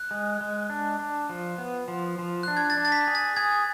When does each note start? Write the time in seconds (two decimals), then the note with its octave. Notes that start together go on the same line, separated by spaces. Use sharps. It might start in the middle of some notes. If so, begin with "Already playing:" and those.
Already playing: F#6
0.11 G#3
0.41 G#3
0.70 D4
0.99 D4
1.29 F3
1.58 B3
1.88 F3
2.19 F3
2.43 D4 F#6
2.57 G#6
2.70 A6
2.77 D4
2.85 A6
2.92 B6
3.07 G#4
3.15 A6
3.36 G#4 G#6